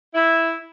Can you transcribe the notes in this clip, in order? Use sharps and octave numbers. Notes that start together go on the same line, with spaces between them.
E4